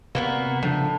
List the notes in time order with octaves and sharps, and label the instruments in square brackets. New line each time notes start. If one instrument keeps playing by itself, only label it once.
[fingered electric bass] C3 [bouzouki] A#3 B3 F#4
[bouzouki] A2 [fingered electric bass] C#3 F3 D4